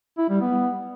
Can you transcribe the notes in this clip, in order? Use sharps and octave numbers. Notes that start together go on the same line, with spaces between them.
E4
G3
B3